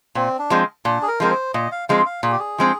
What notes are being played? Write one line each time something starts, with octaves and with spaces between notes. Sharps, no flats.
A#2 C4
D4
F3 G#3 C4
A#2 D4
G#4
A#4
F3 G#3 C4 A#4
C5
A#2 D#5
F5
F3 G#3 C4 F5
F5
A#2 G#4
G4
G#4
F3 G#3 C4